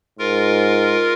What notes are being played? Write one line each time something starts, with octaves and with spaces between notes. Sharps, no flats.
G#2 F4 A#4